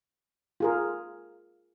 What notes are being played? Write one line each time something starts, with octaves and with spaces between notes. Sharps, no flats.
F4 G#4 A#4